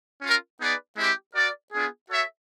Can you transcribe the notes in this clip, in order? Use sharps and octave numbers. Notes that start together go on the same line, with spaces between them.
C#4 F4 A#4
B3 D#4 G#4 B4 D5
G#3 C4 E4 G4
F#4 A#4 D5
B3 D4 F4 G#4
F#4 A4 C#5 E5